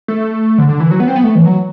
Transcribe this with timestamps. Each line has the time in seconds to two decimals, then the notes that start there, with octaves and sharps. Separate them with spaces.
0.08 A3
0.58 D3
0.69 D3
0.80 E3
0.91 F#3
1.00 B3
1.08 C4
1.16 B3
1.24 A3
1.35 E3
1.46 F#3